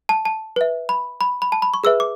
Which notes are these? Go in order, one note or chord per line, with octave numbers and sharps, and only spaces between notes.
A5
A5
B4 E5
B5
B5
B5
A5
B5
C#6
G#4 B4 E5 E6
D6